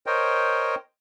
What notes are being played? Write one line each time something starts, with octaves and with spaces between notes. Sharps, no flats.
A#4 C5 C#5 D#5 G5